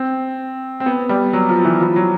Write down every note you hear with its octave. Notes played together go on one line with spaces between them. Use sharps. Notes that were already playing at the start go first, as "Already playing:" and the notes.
Already playing: C4
C4
B3
G3
F#3
F3
E3
F3
F#3